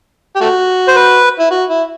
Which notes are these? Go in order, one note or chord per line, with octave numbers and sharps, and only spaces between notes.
G4
A3 F#4
C5
B4
E4
F#4
E4